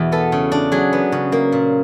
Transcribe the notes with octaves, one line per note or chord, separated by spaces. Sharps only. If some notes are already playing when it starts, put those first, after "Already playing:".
Already playing: E2 B2
B3 A4
C#3
D4
F#3 G#4
B3
C#3
A#3
A#2